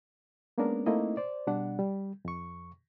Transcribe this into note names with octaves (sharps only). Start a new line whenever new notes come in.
G#3 A#3 B3 C#4 D4 A#4
A3 A#3 C4 D#4 E4 D#5
C5 D5
B2 G3 D4 F#5
G3
F2 C#6